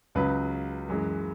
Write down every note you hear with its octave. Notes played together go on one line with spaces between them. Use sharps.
C#2 C#3 F#3 B4
F#2 E3 G#3